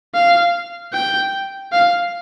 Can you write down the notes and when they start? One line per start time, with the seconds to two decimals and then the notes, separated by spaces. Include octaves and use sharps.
0.14 F5
0.93 G5
1.72 F5